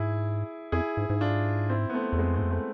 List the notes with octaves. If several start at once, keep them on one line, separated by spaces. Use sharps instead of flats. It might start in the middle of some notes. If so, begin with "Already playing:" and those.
Already playing: G#2 E4 G#4
F2 E4 G#4
G#2
G#2
D4 F4
C4 E4
B3
A3 C4
E2
F2 G#3 B3
G#2 A3 C4
F2
A3 C4